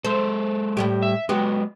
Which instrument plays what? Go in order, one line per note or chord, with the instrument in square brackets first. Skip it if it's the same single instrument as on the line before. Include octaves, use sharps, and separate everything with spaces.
[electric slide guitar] G#3 A4 [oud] C5
[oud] A2 G3 G4
[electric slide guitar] E5
[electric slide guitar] F#3 G#3 [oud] B3 F#4 G4